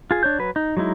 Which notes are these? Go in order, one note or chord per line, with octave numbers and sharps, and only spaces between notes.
F4 G#4
D4 C#5 G6
F#3 B4
D#4
F#3 G#3 D#4 E4